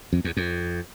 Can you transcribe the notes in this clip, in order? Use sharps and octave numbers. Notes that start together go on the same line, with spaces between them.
F2
E2
F2